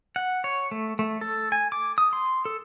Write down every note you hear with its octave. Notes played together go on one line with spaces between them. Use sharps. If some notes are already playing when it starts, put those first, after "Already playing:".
F#5
C#5
A3
A3
A4
G#5
D6
D#6
C6
A4